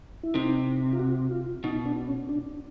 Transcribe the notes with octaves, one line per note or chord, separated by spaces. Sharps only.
E4
C3 D#4
F4
F#4
F4
B2 D#4
D4
C#4
D4